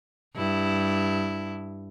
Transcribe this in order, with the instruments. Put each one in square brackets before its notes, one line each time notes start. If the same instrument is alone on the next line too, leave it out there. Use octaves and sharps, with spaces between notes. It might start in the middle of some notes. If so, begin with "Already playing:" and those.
[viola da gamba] G2 E4